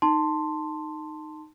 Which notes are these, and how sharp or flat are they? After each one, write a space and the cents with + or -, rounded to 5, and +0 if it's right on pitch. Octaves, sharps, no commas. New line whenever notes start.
D#4 -5 A5 +15 C6 +0